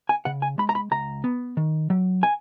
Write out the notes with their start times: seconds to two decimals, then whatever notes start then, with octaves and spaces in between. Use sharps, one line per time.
0.09 G#5
0.25 C#3 F#5
0.42 G#5
0.58 G#3 B5
0.69 A#5
0.75 B5
0.91 C#2 A#5
1.24 B3
1.57 D#3
1.90 F#3
2.23 G#5